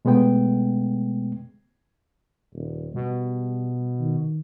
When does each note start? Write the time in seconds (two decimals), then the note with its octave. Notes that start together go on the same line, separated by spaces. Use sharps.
0.05 B2 G#3 A3 B3 G5
2.53 D#1
2.95 B2 G3
3.99 D#3